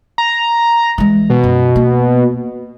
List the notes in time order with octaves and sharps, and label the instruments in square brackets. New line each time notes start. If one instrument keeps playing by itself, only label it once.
[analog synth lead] A#5
[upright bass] E3 G#3
[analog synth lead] B2
[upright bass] F#2
A#3